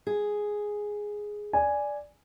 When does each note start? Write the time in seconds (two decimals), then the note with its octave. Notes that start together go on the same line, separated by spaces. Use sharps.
0.07 G#4
1.53 D5 G#5